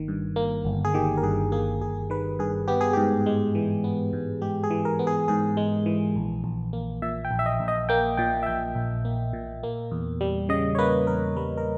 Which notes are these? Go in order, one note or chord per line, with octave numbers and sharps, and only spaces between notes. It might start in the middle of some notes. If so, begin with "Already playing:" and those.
Already playing: G1 D#3 A#3
G2
A#3
G1
G#4
D#3 G4
A#4
G2 G#4
A#3 G#4
G1 G#4
D#3 B4
G2 G#4
B3 G4
G#4
G#2 G4
G#3
E3
B3
G#2
G#3 G4
G#4
E3
A#4
B3
G#4
G#2 G#4
G#3
E3
A#1
A#1
A#3
A#2 E5
G5
A#1
E5
D#5
A#1
D#5
A#3 G5
A#2 G5
E5
A#1 G5
A#1
A#3
A#2
A#3
E2
G3
C#3 D#5
C#5
A#3 B4
E2 A#4
G3 B4
A#4